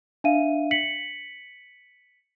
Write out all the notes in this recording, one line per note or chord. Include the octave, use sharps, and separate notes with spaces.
D4 E5 F5 D#7
B6 C#7 F#7